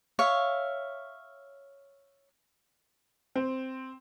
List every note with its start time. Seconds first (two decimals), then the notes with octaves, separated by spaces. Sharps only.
0.19 C#5 E5 F5
3.36 C4